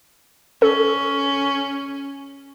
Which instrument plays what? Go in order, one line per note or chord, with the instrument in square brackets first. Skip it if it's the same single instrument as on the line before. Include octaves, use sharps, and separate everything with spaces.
[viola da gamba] C#4 [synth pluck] A4